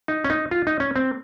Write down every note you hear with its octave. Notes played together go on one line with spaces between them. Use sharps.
D#4
C#4
D#4
F4
D#4
C#4
C4